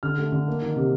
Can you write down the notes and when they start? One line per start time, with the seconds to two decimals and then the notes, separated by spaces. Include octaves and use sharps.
0.03 D3 F6
0.18 A3
0.32 D3
0.48 A#3
0.62 D#3
0.76 C3